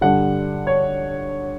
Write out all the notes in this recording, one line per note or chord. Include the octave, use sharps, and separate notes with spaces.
G2 D3 G3 F#5
C#5